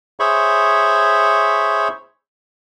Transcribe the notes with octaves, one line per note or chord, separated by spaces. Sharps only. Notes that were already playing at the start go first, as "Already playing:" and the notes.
G#4 C5 C#5 E5 B5 C#6